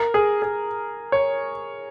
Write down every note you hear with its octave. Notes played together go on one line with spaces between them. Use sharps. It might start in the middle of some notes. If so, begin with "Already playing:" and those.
Already playing: A#4
G#4
G#4
C#5